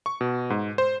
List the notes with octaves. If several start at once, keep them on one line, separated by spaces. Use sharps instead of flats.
C#6
B2
G#2
C5